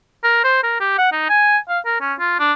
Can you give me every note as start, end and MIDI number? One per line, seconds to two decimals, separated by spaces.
0.24 0.44 70
0.44 0.63 72
0.63 0.80 70
0.80 0.95 67
0.98 1.12 78
1.13 1.24 63
1.29 1.58 80
1.69 1.79 77
1.86 1.96 70
2.01 2.14 61
2.20 2.37 65
2.39 2.53 62